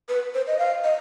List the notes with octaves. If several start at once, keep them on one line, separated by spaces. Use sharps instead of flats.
B4
C5
D#5
F5
D#5